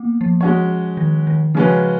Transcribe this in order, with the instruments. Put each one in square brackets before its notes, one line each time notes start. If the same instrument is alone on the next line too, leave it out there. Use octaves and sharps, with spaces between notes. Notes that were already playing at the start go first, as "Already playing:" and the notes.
Already playing: [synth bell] A#3 B3
F3
[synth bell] F3 [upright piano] G#3 C#4 F#4 C#5
[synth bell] D#3
D#3
[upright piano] C#3 G#3 C#4 F#4 B4 [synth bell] F3